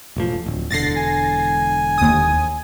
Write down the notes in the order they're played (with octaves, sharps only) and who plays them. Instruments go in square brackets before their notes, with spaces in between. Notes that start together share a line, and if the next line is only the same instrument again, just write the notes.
[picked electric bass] E1 A1 F3
D1
[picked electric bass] E1 D3 [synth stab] A6 A#6 C7
[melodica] G#5
[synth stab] D#2 D#6